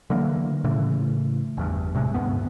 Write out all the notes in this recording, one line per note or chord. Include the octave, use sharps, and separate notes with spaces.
D3 E3 F#3 A#3
A2 C#3 E3 A3
G1 E2 G2
A2 C3 G3 G#3
G#1 D2 G2 B3